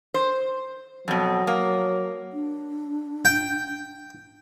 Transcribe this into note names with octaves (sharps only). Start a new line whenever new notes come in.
C5
F2 B2 F#3
A#3
D4
G5